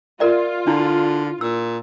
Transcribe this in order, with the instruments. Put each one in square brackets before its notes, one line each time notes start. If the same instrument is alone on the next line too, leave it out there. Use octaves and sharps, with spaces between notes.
[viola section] F4 [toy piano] A#4 D5 E5
[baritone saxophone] D3 [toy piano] D4 E4
[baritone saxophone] A#2 [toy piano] E6